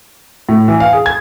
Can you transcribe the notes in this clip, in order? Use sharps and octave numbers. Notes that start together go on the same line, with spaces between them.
A2
E3
F5
G#4
G#6